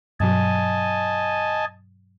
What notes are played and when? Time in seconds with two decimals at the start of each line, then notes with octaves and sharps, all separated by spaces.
0.20 G2 B2 F#3 D#5 G#5 A5